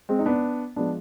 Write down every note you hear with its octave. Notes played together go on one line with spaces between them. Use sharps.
G#3 C4
D#4
B3 D4
F3 G#3 B3 D4